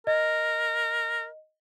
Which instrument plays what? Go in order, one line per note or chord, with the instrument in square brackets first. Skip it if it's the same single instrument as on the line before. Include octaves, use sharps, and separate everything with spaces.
[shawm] A#4 [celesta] D#5